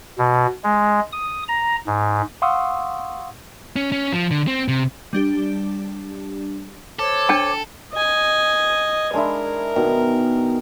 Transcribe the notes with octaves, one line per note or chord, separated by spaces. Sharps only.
B2
G#3
D#6
A#5
G#2
F5 F#5 C6 C#6 D#6 E6
C#4
C#4
F3
D3
C4
C3
G3 D4 G4
A4 C5 C#5 D6
D4 G5 A5
D#5 G#5
G#3 D4 E4 A#4
B2 D#3